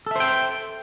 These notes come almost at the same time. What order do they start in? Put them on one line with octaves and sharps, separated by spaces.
A4 E5 C5 G5